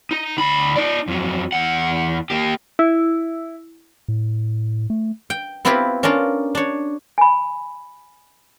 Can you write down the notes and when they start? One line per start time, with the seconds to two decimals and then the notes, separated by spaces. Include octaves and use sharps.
0.11 D#4
0.37 D2 B5
0.76 D#4 D5
1.08 F2 F#3
1.52 E2 F#5
2.30 A#3 G4
2.79 E4
4.08 A2
4.90 A3
5.30 G5
5.65 B3 C4 E4 F4 G4 B4
6.03 C#4 D4 F4 A#4
6.55 D4 C#5
7.18 G#5 B5